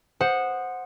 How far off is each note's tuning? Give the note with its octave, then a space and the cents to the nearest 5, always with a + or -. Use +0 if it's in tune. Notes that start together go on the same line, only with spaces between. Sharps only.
C5 +0 F#5 -10 D#6 -15